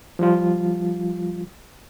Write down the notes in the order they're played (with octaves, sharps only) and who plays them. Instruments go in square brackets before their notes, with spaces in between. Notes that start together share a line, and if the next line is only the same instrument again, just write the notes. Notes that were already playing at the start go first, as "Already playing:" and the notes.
[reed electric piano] F3 G3 F4